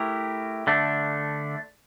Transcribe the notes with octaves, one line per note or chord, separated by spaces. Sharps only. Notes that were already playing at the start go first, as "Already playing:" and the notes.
Already playing: A3 E4 G4 A#4
D3 A3 D4